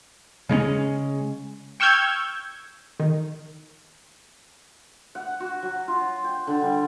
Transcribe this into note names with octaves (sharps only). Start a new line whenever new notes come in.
C#3 G#3 B3 C#4
G5 C#6 E6 F6 G6 G#6
D#3
F#5
F#4
F#3
F4
G5
D3
G3